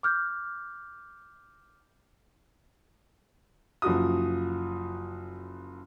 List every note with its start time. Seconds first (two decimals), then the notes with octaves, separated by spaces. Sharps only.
0.03 D6 F6 G6
3.82 F#1 F3 F#4 D#6